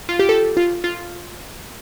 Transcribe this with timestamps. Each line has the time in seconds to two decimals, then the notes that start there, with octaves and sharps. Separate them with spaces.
0.09 F4
0.19 G4
0.29 A4
0.57 F4
0.84 F4